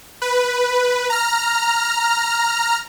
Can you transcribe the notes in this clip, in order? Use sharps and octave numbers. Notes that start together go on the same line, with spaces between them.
B4
A#5 F6